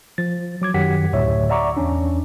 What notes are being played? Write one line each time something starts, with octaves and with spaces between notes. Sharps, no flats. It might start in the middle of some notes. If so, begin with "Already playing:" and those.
F3 A6
F#3 D6 G#6
F#2 D#3 F#3 G4 F#5 B6
D2 A2 C#5 E5
D5 E5 F#5 A#5 C#6 D6
E2 C#4 D4